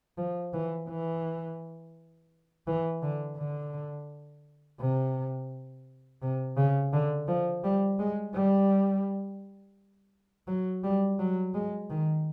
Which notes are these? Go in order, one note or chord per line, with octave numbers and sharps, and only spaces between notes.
F3
E3
E3
E3
D3
D3
C3
C3
C#3
D3
F3
G3
G#3
G3
F#3
G3
F#3
G#3
D#3